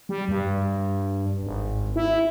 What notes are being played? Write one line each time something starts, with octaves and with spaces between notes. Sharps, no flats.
G3
G2
G#1
E4